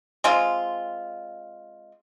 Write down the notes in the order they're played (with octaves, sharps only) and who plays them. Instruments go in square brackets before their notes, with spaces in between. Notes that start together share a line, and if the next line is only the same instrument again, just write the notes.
[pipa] G#3 C4 F4